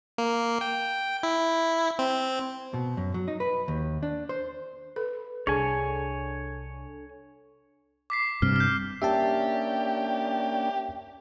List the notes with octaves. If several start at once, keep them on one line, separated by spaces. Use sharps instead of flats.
A#3
G5
E4
C4
B2
F#2
F#3
D#4
B4
D#2
D4
C5
A4 B4
C2 D4 G#4 A4 C#5 G#5
D6 B6 C7
G2 C3 F6
F6 G6
A#3 C#4 D4 G4 E5 G5 A5